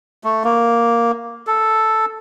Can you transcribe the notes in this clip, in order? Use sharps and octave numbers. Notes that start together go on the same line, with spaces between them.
A3
A#3
A4